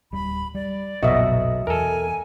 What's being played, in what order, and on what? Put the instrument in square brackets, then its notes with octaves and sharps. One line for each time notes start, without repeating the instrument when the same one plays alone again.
[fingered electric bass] D1 G3 [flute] B5
[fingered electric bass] G3 [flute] D5
[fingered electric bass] F#1 A#2 F3 [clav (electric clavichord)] B1 F#4 [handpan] D#5 E5
[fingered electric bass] E2 [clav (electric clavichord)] A4 A#4 [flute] G#5